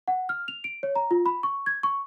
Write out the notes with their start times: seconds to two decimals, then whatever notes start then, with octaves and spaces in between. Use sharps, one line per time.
0.08 F#5
0.29 F6
0.48 F7
0.64 D7
0.83 C#5
0.96 A#5
1.11 F4
1.26 B5
1.43 C#6
1.66 G#6
1.83 C#6